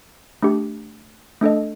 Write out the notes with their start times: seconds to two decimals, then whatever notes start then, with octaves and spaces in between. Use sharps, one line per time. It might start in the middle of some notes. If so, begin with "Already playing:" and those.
0.43 A3 D4 G4
1.41 A3 D4 A4 D#5